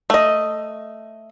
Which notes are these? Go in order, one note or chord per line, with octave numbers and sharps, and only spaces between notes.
A3 D#5